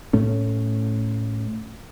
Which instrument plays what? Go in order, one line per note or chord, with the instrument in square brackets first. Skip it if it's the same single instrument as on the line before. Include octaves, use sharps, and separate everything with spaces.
[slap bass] A2 A3 C#4